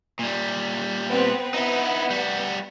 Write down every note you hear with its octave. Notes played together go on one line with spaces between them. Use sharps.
A#2 G3
B3 C4 B4
B3 D#4 E4
G3 F#4